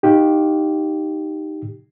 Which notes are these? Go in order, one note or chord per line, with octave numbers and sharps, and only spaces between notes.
D#4 G4